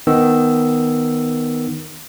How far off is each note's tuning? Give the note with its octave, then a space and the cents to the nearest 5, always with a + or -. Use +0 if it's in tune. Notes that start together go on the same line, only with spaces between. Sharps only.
D#3 +0 B3 +0 E6 +0